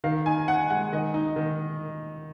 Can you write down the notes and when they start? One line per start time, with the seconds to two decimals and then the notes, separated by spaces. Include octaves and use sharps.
0.04 D#3 F5
0.26 D#4 G#5
0.48 D#4 F#5
0.70 G#3 F#5
0.92 D#3 D#5
1.14 D#4
1.36 D#3